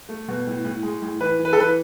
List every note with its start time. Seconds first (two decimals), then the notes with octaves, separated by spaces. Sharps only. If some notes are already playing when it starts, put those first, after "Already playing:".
0.09 A3
0.28 B2
0.47 A2
0.65 A2
0.83 G#3
1.02 A2
1.20 E3 B4
1.39 E3
1.45 B4
1.53 A4
1.58 E3 B4